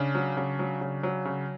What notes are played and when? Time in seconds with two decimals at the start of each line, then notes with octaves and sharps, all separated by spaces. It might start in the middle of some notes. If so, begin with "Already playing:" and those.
Already playing: C#3 D4
0.15 F#3
0.37 C#3
0.59 F#3
0.81 C#3
1.03 F#3
1.25 C#3